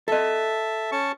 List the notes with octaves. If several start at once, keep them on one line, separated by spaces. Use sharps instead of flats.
A4 D#5 E5 A5
C#4 A5 C#6